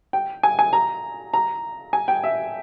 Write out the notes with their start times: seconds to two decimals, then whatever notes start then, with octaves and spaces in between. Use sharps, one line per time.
0.13 G5
0.43 G#5
0.59 G#5
0.73 A#5
1.33 A#5
1.93 G#5
2.08 G5
2.24 E5